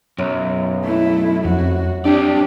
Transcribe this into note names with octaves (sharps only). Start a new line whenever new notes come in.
B1 F#2
A3 E4
F2 F#4
C4 D4 G4 D5